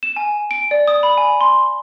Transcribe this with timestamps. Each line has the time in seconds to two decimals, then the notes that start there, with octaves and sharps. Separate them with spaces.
0.03 E7
0.16 G#5
0.51 D7
0.71 D5
0.88 D#6
1.03 B5
1.17 G#5
1.41 C6